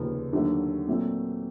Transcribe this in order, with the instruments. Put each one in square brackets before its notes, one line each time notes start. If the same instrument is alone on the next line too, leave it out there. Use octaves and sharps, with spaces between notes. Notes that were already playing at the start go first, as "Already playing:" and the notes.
Already playing: [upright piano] F1 D#2 C#3 F3
D#2 D3 F#3 A3 D4
A#2 F#3 A3 C4